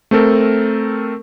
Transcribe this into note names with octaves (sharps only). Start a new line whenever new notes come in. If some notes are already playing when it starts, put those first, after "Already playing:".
A3 C4 A4 A#4